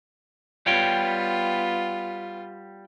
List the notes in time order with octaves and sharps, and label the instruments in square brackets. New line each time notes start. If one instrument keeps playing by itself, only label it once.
[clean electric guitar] G3 C#5 G5 [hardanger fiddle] B3 F4